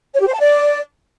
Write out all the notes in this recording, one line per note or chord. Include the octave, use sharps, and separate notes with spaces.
C#5
G4
C5
A5
D5